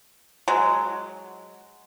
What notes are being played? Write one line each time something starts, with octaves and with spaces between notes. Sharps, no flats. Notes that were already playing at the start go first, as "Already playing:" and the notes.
F#3 G#3